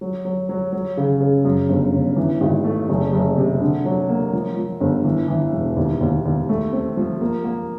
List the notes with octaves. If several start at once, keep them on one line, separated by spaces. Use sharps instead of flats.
F#3
F#3
F#3
F#3
C#3
C#3
F#2
G1
G1
E3
G#1
A3
F#1
F#1
C3
D3
F#3
A#3
F3
F3
G1
E3
E3
E1
D#2
D#2
D#2
A3
C4
F3
A#3
A#3